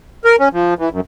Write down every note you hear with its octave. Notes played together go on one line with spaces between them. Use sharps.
A#4
C#4
F3
E3
F#2